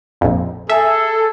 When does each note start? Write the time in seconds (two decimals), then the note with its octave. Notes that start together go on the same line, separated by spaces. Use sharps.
0.21 A#1 F2
0.69 G#4 A4 E5